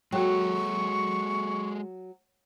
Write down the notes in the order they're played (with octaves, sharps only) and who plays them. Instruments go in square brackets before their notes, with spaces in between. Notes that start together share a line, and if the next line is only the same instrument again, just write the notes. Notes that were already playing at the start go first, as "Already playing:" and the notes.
[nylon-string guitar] F#3 [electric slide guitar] G#3 G#4 A4 [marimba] F#4 G5 [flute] C#6